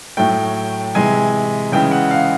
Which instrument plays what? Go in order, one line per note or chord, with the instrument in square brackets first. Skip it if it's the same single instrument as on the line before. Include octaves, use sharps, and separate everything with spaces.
[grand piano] A2 F#3 A3 G5
C3 E3 G#3 G#5
C#3 E3 G#3 G5
F#5
F5